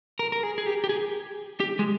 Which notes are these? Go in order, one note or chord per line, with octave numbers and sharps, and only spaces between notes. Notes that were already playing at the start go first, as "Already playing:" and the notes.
A#4
A#4
G#4
G#4
G4
G4
G#4
G4
G#3